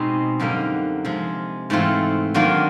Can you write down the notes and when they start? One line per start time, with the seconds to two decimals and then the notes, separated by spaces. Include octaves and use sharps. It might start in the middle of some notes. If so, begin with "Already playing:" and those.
Already playing: B2 G#3 C4 D#4
0.40 F#2 D3 G3 A#3 D#4
1.05 C3 F3 G#3
1.70 G#2 E3 A3 C4 F4
2.34 D#3 F#3 A#3 D4 F4